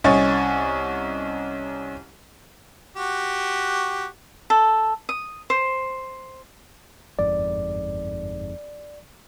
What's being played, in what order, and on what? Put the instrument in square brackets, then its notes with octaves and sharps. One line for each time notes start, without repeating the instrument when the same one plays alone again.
[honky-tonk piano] C2 C#4 D#5 G#5 C#6 A6
[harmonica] F#4 G4
[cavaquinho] A4
D#6
C5
[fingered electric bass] G1 F2 G#2 [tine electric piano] D5